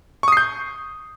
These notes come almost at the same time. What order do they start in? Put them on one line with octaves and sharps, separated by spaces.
C#6 D#6 C7 G6